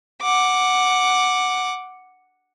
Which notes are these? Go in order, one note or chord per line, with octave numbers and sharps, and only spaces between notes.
F#5 D6